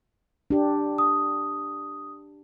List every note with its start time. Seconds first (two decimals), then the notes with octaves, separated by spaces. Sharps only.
0.51 D4 G4
0.98 D#6